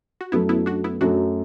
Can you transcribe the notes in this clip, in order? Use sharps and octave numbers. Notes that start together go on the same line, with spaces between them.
F#4
F#2 F#3 A3 B3 E4
B3 E4
D4 F#4
B3 E4
F#2 F#3 A3 D4 F#4